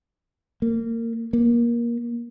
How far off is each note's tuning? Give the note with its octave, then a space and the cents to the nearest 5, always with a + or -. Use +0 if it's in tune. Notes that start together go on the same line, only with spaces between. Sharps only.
A#3 -25
A#3 +20